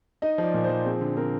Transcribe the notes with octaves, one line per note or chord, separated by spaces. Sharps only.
D#4 D#5
F3 D5
A#2
C5
F3
C4 G#4
D3
C4 A#4